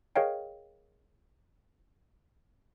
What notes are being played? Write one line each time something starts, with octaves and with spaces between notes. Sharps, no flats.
G#4 A#4 C#5 D#5 F5 G5